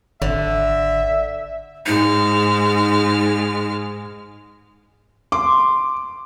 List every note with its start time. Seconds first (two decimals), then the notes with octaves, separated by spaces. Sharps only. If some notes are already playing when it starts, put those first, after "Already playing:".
0.22 G#1 D3 E5
1.86 G#2 G#3 D#4 F6
5.32 C6 D6